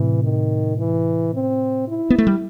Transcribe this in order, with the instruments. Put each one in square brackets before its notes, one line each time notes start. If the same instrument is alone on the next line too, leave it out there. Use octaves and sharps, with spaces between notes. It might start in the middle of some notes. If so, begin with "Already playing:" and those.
Already playing: [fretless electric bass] A2 C3 [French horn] E3
[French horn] D#3
E3
C4
E4
[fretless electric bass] B3
A3
G3